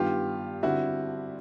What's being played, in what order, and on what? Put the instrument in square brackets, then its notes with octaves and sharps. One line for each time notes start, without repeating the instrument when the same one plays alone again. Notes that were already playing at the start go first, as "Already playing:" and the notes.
Already playing: [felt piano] G2 D#3 G3 B3 [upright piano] F4 G4
[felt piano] D3 G3 C4 [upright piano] E4 F#4